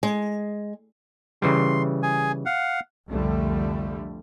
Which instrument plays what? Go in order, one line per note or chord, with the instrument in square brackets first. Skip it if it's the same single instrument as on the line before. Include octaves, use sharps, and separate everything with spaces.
[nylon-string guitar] G#3
[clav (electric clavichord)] C#3 E3 G3 [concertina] C6
[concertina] G#4 G#5
F5 F#5
[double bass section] C2 F2 D3 G3 A3